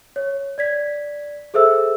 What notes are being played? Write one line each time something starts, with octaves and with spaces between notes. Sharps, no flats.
C#5
D5 G#6 B6
G#4 A4 C5 E5 E6